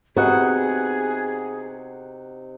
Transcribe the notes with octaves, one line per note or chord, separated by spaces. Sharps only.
C3 B3 D#4 F#4 G#4 F#5